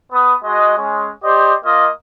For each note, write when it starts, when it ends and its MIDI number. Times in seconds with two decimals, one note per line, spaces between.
0.12 0.34 59
0.12 0.34 87
0.44 0.73 56
0.44 0.73 66
0.44 0.73 75
0.77 1.10 56
0.77 1.10 61
1.24 1.54 67
1.24 1.54 72
1.24 1.54 74
1.24 1.54 75
1.65 1.88 58
1.65 1.88 65
1.65 1.88 75